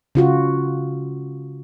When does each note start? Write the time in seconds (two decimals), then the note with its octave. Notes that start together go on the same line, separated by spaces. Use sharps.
0.15 C#3 F4 F#4